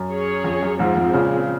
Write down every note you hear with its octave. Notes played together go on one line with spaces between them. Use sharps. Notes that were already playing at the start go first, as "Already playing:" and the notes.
Already playing: F#2
C#4 G#4 C#5
F2
F#2
F2 G#2 F3 G#3 C4
F2 G#2
A#2 C#3